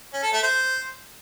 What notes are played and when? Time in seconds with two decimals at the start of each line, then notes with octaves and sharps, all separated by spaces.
0.13 C#4
0.23 A4
0.33 A3
0.43 C5